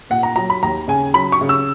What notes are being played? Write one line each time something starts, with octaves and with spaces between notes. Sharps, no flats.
A#2 F#5
A#5
F#3 A#5
B5
D#2 A#5
C#3 G#5
F#3 B5
C#6
C#3
E6